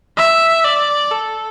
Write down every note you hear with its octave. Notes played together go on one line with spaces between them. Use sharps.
E5
D5
A4